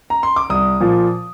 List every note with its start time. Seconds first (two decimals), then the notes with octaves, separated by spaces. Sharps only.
0.10 A#5
0.23 C6
0.36 D6
0.50 C2 D#6
0.80 A#2 F3